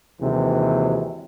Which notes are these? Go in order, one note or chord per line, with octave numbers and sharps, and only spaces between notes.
D#2 C3 E3 F#3 G#3